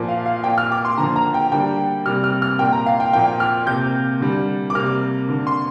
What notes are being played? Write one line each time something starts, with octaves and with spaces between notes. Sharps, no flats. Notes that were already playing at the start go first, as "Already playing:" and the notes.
Already playing: A#2 F3 A#3
F5
F5
A#2 A#3 G5
F6
D6
C6
D3 F3 A#3 A#5
A#5
G5
D3 G3 A#3 G5
C3 G3 A#3 F6
F6
F6
A#2 A#3 G5
A#5
F5
G5
A#2 F3 A#3 G5
F6
C3 A#3 G6
D3 G3 A#3
D6
C3 G3 A#3 F6
D3 A#3
C6